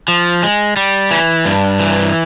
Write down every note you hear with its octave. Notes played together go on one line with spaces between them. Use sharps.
F3
G#3
G3
E3
G2
E3